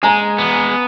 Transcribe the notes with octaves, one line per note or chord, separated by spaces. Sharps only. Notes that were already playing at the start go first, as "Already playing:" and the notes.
G#3 G#5 A#5
B3